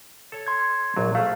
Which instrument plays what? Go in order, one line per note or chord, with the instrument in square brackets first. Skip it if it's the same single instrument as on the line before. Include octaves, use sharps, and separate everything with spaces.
[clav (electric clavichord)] A4 C#5
[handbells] C6 G#6
[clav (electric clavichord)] A#1 F#3
[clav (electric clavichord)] A3 [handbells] F5